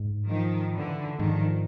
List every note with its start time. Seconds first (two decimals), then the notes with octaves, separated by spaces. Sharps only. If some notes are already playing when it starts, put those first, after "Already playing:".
Already playing: G#2
0.30 D#3 F3
0.74 D3 E3
1.20 G#2 D#3 F3